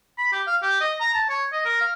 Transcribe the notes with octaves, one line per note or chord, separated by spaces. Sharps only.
B5
G4
F5
G4
D#5
A#5
A5
C#5
D#5
A#4
F5